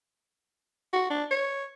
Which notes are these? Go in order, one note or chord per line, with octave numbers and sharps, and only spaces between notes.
F#4
D4
C#5